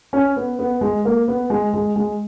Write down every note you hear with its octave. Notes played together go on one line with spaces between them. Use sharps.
C#4
B3
B3
G#3
A#3
B3
G#3
G#3
G#3